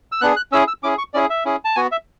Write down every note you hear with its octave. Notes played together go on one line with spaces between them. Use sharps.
E6
B3 D4 G#4 F#6
F#6
C#4 E4 G#4 E6
E6
C#4 E4 G#4 D6
C#6
C#4 E4 G#4 D5
E5
C#4 E4 G#4
A5
B3 F#4 G#5
E5